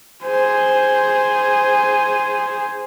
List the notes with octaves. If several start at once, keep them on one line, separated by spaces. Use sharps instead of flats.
G#4 C5